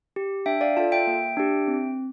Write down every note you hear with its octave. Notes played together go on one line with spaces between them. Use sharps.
G4
D4 E5 G5
D5 F5
F4 A4 F5 A5
E5 G5
A#3
D4 G4
C4